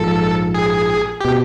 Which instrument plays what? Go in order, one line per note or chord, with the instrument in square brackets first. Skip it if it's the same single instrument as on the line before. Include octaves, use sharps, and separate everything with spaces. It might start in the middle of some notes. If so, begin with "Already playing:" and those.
Already playing: [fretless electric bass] A#1 G#2 F3 [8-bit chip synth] A4
[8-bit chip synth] G#4
[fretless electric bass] B2 [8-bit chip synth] G4